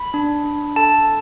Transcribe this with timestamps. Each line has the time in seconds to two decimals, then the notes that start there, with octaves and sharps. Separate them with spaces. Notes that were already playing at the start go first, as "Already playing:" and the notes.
Already playing: B5
0.14 D4
0.45 D4
0.76 A4 A5